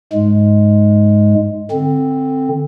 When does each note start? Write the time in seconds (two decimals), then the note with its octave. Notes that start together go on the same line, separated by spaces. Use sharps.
0.13 G#2 G#3
1.71 D3 C4